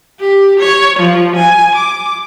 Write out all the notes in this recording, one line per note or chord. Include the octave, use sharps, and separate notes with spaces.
G4
C#5
F3
G#5
D6